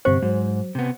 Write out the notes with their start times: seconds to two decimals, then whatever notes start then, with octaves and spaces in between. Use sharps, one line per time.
0.05 G1 C3 C5 C#6
0.22 G#2 F#3
0.75 C3 B3